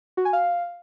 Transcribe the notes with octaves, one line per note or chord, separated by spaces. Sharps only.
F#4
G#5
F5